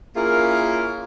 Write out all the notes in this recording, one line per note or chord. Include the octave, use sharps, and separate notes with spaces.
A#3 C#4 E4 F4 G#4 A#4